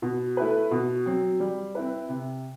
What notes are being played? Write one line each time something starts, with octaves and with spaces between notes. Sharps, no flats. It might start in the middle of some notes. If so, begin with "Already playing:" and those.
B2
A3 E4 B4
B2
F#3 C4
G3
C4 E4 B4
C3